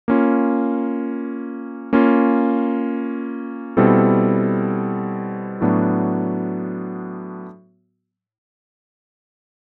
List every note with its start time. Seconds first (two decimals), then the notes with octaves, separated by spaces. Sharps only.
0.08 A#3 C#4 F4
1.93 A#3 C#4 F4
3.77 B2 G3 C4 E4 A4
5.61 A2 F#3 B3 D4 F#4